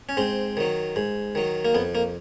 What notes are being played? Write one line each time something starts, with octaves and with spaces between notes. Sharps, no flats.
C#4
G#2 C4
D#3 F#3
G#2
D#3 F#3
A#3
F2 B3
A#3